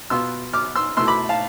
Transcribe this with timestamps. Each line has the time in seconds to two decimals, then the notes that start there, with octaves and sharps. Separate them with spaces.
0.10 B2 B3 F4 C6 E6
0.53 D6 F6
0.76 C6 E6
0.97 B2 A3 E4 C6 E6
1.07 B5 D6
1.29 F5 A5